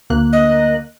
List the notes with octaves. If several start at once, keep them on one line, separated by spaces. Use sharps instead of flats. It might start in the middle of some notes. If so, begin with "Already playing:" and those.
D2 A#3 F#6
D#5